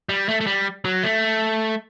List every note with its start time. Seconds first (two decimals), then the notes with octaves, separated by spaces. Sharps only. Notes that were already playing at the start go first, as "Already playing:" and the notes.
0.09 G3
0.29 A3
0.41 A3
0.47 G3
0.85 F#3
1.03 A3